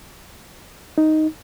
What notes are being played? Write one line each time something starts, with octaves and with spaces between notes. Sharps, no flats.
D#4